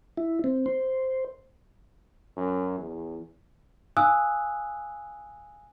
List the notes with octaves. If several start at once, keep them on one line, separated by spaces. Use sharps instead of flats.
E4
C4
C5
F#2
E2
F5 G#5 D#6 E6 F#6